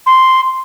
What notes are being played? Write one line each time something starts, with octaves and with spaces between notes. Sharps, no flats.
C6